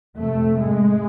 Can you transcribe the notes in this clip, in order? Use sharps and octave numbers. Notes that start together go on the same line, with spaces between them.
F2 C3 A3
G#2 G#3